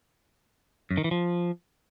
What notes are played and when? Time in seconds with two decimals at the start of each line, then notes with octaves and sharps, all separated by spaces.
0.91 F#2
0.97 D#3
1.04 E3
1.11 F3